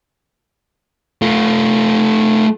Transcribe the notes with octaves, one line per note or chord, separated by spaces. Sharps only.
A3 F4